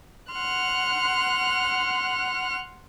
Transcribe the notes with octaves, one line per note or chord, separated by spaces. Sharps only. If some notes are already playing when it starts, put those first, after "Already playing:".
F#5 C6 F6 F#6